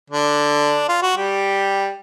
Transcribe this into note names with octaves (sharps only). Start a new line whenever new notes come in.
D3 D4
F4
F#4
G3 G4